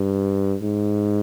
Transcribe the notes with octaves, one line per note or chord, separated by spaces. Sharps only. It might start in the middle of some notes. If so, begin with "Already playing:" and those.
Already playing: G2
G#2